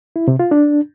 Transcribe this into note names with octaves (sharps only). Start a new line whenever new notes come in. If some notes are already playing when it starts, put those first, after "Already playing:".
E4
C3
F4
D4